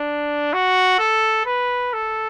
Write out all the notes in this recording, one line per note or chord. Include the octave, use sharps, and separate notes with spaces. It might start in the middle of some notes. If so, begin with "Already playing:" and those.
Already playing: D4
F#4
A4
B4
A4